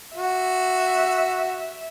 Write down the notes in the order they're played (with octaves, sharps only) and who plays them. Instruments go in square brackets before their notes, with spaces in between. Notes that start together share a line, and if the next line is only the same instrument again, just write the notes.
[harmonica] F#4 [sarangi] E5